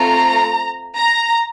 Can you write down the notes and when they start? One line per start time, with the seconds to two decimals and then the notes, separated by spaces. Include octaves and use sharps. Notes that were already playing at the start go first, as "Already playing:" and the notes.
Already playing: A3 C4 F4 A4 A#5
0.96 A#5